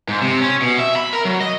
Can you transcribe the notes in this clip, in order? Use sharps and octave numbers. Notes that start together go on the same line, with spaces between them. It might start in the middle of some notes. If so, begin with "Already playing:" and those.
G#2
C3
C#4
B2
E5
B5
A#4
F#3
D#5